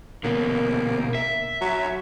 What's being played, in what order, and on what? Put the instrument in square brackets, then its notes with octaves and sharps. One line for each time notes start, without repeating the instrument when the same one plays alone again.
[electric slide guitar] B2 D3 [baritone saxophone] A#3
[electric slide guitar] E5
[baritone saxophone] F#3